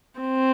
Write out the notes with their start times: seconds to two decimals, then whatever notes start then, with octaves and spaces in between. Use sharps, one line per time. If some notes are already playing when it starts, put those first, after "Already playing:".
0.20 C4